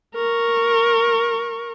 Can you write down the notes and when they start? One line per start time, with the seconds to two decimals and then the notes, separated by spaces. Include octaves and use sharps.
0.15 A#4 C#6